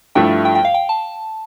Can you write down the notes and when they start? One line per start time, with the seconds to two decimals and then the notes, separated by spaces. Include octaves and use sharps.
0.15 G2 F3 A3 E4 G5
0.45 G5
0.55 G5
0.65 F5
0.74 G5
0.89 A5